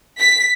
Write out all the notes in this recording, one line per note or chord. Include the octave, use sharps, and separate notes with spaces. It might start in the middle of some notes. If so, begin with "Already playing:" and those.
B6